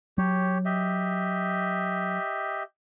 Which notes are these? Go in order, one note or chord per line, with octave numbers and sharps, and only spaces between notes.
F#3 G4 C#5
G4 D#5 E5